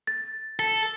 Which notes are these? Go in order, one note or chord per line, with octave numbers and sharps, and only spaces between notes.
A6
A4